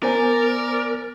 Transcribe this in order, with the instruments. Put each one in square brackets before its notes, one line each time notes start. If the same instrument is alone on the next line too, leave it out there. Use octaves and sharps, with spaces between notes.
[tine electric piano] B3 C5 G#5 [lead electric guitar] A#4 [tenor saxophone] D5